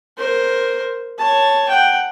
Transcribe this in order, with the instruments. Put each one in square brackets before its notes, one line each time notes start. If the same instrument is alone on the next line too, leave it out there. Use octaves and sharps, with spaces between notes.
[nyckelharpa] A#4 C5
C#5 A5
F#5 G5